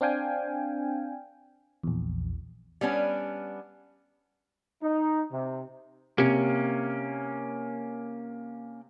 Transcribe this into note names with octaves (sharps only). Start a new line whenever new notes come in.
C4 D4 F5 G5 G#5
A#1 E2
G3 B3 C#4 D4
D#4
C3
C3 A#3 C#4